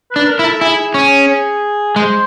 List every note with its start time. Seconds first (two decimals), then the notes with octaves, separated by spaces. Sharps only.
0.11 B4
0.16 D4
0.27 A#4
0.39 E4
0.44 A4
0.61 E4 G#4
0.94 C#4
1.96 G#3 C5